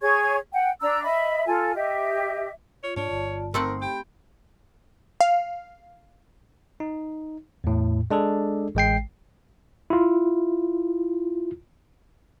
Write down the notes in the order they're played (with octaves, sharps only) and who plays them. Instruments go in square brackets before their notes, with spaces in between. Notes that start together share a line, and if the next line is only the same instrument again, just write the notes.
[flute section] G#4 C#5 C#6 G#6
F#5 G5
D4 A#5 E6
D#5 E5 B5
F4 A4 G#5
G4 D#5 E5
[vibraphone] F4 [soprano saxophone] C#5
[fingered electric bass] G#2 D4 [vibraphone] F4 D5 A5 [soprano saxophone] C#5
[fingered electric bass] G1
[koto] A3 C4 F#5 [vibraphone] D#4 C5 [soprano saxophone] A#4
[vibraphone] G4 B5 [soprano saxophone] G5
[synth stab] F5
[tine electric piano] D#4
E2 A2
G#3 D4 G#4 A4
A1 G#3 G5 C7
E4 F4